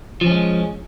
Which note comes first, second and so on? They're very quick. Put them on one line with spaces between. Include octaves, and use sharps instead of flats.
F3 C#4 G#3